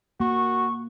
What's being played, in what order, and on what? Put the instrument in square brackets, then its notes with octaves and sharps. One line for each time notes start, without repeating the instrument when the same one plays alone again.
[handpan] A#3 [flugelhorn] F#4 [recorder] C#6